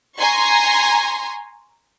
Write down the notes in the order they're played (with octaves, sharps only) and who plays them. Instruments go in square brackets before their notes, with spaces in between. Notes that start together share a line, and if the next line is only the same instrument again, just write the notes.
[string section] G#5 A#5 C6 C#6